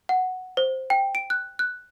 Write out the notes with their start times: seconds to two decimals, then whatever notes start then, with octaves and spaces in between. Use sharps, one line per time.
0.09 F#5
0.57 C5
0.90 G5
1.15 D7
1.30 F#6
1.59 F#6